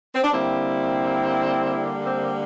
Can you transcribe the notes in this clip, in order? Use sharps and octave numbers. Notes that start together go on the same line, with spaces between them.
C4
D4
D3 G3 A#3 C4 E4
C4